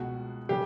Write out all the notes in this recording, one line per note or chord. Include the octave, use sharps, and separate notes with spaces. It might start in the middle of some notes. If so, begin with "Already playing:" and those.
Already playing: C#2 B2 F#4
C#3 G4